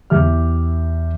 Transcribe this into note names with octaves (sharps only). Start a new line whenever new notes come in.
E2 G4 E5 F6